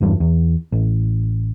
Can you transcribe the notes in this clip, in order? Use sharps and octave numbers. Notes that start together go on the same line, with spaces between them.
F#1 E2 G2
E2
A1